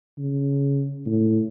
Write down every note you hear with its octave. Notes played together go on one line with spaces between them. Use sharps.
C#3
A2